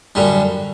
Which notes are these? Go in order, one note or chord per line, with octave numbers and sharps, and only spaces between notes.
F#2 D3 G3